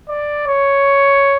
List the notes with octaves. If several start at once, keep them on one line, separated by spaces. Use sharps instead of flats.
D5
C#5